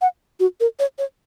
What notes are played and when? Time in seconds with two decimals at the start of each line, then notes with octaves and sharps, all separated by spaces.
0.01 F#5
0.40 F#4
0.60 A#4
0.79 C#5
0.98 C#5